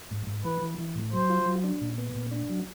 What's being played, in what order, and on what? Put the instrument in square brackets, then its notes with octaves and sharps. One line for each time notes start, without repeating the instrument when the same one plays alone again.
[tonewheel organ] G#2
G#2
[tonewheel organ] E3 [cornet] B4
[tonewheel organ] E3
E3
A2
[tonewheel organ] F#3 [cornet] C5
[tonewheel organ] F4
F#3
D4
A#2
B3
A#2
D4
F#3